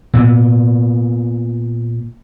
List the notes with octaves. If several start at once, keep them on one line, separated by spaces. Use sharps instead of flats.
A#2 B3